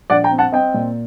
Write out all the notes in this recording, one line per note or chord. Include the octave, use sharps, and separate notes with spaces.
A#1 D5 F#5
G5 A#5
C4
F#5 A5
C4 D#5 G5
A#2